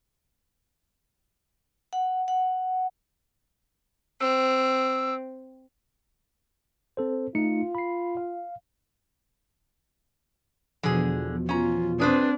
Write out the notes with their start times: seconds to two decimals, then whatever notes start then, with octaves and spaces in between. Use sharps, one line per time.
1.93 F#5
2.28 F#5
4.21 C4 E6
6.97 C4 A4 C5
7.35 A3 D#4 F4 C#7
7.75 B5 C7
8.17 F5
10.83 E2 B2 D3 F3 G#4
11.49 C#4 F4 A#5
12.00 C4 D4 G#4 B4 C5